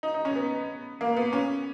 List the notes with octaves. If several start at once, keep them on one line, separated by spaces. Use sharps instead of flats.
D#4
D#4
C#4
B3
A#3
B3
C#4